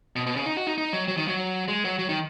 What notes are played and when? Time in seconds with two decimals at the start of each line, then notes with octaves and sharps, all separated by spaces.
0.16 B2
0.26 B2
0.36 C#3
0.46 D#4
0.57 F#4
0.67 D#4
0.78 D#4
0.93 F#3
1.08 F#3
1.17 D#3
1.28 F#3
1.68 G#3
1.85 F#3
1.99 F#3
2.09 D#3